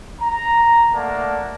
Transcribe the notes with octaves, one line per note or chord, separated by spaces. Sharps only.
A#5
A3 A#3 D5 F#5 A5